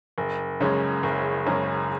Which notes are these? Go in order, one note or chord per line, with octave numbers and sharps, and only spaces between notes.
F#1
F#2 C#3 G#3 C#4
F#1
F#2 C#3 G#3 C#4